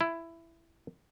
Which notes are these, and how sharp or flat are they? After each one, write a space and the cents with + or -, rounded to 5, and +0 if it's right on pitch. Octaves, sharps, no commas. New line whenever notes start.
E4 +10